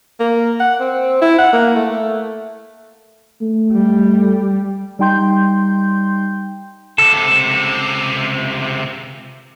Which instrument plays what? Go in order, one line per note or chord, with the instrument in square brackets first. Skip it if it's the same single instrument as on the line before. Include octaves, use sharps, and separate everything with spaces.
[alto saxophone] A#3
F#5
C4
E4
F#5
A#3
A3
[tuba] A3
[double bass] G3
[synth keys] G3 D#4 G5 C6 G6
[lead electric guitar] C#2 C3 [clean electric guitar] A4